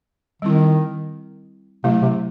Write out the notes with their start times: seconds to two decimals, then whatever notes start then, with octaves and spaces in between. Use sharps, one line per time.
0.42 D#3 G3 C4 E4
1.84 C3 F#3 A3 E4
2.02 C3